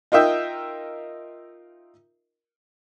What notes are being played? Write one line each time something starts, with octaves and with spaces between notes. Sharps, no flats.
D#4 F4 A#4 D#5 E5 G5